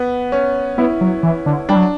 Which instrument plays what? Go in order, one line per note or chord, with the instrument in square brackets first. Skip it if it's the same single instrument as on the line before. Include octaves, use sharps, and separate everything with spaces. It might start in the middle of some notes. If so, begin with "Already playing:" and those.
Already playing: [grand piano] B3
C#4
[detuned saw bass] B3 [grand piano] E4
[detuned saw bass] F#3
E3
D3
[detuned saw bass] G3 [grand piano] D4
[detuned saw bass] F#3